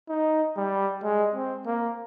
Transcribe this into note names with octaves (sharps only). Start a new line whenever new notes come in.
D#4
G3
G#3
C4
A#3